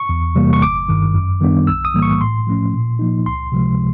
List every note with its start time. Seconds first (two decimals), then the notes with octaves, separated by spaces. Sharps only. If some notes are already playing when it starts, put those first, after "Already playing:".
Already playing: C#6
0.09 E2
0.35 C3 E3 G3 A#3
0.53 C#6
0.62 G1 D6
0.89 G2 D#3
1.14 F#2
1.41 D#3 G3 B3 D4
1.67 B1 E6
1.85 D#6
1.94 A2 E3 G3 A#3
2.02 C#6
2.20 A2 C6
2.47 F3 A3 C#4
2.74 A#2
2.99 F3 A#3 D#4
3.26 C#2 C6
3.52 C3 F3 G#3